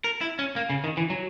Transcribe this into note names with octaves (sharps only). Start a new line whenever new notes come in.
A#4
E4
C#4
A#3
C#3
D#3
E3
F#3